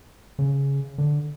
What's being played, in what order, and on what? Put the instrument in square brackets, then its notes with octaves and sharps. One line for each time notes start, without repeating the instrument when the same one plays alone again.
[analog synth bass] C#3
D3